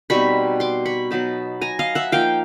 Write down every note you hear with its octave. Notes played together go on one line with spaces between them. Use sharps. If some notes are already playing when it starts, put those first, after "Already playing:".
B2 G3 C4 D#4 B5 C#6
C6 D6
B5 C#6
F#3 B3 D#4 A5 B5
G#5 A#5
D#5 F5
E5 F#5
F3 A#3 D#4 F5 G5